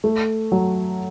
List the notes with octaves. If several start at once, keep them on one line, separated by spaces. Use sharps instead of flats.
A3
F#3